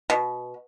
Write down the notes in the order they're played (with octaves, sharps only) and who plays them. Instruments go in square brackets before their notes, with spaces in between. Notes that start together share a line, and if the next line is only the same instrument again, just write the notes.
[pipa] B2